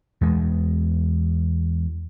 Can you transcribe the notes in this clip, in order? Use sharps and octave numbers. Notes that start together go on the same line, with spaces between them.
E2 G#3